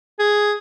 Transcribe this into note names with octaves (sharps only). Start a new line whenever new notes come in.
G#4